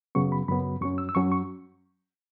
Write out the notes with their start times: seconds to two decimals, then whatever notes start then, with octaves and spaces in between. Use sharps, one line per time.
0.15 F#2 C#3 F#3 B3 C#6
0.32 B5
0.48 F#2 C#3 F#3 B3 B5
0.81 F#2 F#3 C#4 C#6
0.98 E6
1.09 E6
1.15 F#2 F#3 C#4 C#6
1.32 C#6